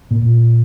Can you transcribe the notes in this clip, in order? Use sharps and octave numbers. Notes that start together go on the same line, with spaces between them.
A#2